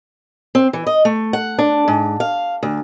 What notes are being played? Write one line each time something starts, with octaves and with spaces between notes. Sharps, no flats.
C4
E3
D#5
A3
F#5
D4
G#2
F5
D2